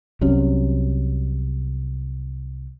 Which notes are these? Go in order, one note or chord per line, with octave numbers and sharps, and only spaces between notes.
C2 C3 F#3 C#4